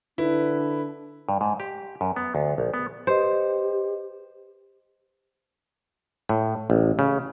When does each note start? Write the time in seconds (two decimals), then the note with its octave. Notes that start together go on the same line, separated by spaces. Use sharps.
0.18 D3 D4 E4 B4
1.29 G2
1.41 G#2
1.60 G4
2.01 F#2
2.16 B3
2.35 D2
2.58 A#1
2.74 B3
3.07 G4 B4 C5 D#5
6.29 A2
6.70 A1
6.99 C#3